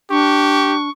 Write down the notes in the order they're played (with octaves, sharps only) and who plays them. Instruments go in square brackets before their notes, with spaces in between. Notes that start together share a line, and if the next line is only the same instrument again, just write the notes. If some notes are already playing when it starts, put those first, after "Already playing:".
[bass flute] D4 [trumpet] G4 [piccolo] C#6